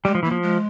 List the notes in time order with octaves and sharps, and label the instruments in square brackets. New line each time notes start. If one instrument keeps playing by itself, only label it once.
[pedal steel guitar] G3 [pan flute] G#3
[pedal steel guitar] F3
[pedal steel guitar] E3 [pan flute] A#3
[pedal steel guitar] F3
[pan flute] G#3